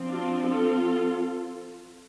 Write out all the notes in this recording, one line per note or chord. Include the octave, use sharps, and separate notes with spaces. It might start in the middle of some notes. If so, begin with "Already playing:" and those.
Already playing: F3 C4
D4 F4
F4 A4